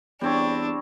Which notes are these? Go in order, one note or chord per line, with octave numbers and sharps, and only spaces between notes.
E2 G3 C4 D4 C#5